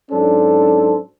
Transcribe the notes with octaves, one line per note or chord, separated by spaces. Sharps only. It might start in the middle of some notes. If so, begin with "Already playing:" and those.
G#2 F#3 C#4 D4 A4 C5